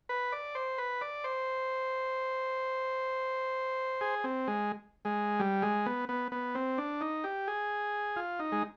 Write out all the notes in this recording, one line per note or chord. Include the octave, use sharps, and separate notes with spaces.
B4
D5
C5
B4
D5
C5
G#4
C4
G#3
G#3
G3
G#3
B3
B3
B3
C4
D4
D#4
G4
G#4
F4
D#4
G#3